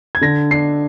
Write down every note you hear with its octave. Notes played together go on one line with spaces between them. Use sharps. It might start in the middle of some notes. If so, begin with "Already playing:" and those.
G#6
D3 A#6
D4 C7